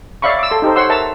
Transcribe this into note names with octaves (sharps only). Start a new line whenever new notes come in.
C#5 D5 E5 F5 B5 C#6
D6 E6
A4 C6
D#4 G4 A4 C5
C5 C#5 F#5 C6 C#6 E6
A#4 E5 A5 A#5 E6